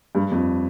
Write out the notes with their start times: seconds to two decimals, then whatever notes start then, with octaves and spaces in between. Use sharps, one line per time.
0.15 G2
0.31 F2